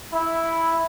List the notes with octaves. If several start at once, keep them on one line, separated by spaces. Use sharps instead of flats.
E4